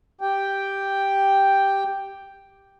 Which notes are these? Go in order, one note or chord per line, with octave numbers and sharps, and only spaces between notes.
G4 G5